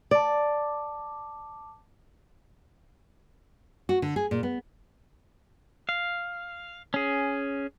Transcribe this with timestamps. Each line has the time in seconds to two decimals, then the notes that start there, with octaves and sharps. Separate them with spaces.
0.11 D5 A5 D6
3.89 F#4
4.02 D3
4.16 G#4
4.31 A#2
4.43 B3
5.89 F5
6.94 C#4 G#4